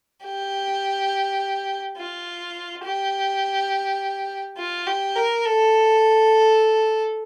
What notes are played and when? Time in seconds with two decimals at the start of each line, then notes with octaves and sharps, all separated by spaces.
0.24 G4
1.97 F4
2.84 G4
4.58 F4
4.87 G4
5.16 A#4
5.45 A4